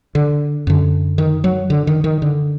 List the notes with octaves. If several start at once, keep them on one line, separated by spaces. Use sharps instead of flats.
D3
F#2 D3
D#3
F#3
D3
D#3
D#3
D3